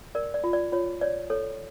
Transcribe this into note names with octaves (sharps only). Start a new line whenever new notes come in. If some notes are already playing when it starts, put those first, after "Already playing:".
A#4 D5
D5
F4
D5
F4 C#5
C#5 D5
A4 C#5